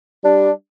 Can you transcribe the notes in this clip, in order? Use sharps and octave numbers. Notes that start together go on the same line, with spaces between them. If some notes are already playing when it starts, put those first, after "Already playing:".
G3 D4